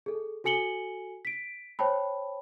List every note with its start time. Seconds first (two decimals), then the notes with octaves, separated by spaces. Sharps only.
0.06 G#4 A4
0.44 F#4 A4 G#5 C#7 F#7 G7
1.25 B6 D7
1.79 C5 C#5 G5 A5 B5